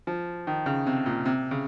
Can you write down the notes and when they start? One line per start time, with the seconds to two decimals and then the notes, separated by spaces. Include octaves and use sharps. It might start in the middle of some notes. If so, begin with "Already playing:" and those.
0.07 F3
0.47 D#3
0.66 C#3
0.86 C3
1.06 A#2
1.26 C3
1.51 C#3